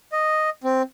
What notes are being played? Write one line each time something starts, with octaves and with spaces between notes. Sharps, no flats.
D#5
C4